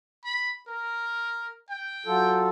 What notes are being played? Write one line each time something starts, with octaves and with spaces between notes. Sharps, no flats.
B5
A#4
G5
F#3 F4 A4